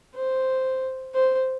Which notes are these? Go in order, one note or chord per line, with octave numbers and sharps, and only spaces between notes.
C5
C5